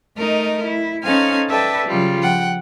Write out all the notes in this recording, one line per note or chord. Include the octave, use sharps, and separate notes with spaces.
A3 D#4 A#4 D#5
E4
C#4 D#4 A4 C5 F5 G#5
A4 B4 D5 E5 G5 A5
C#3 F#3 G3 F4
F3 F#5 G5